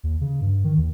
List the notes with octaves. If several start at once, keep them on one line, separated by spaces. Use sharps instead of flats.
D#2
C#3
G2
D#3
D#2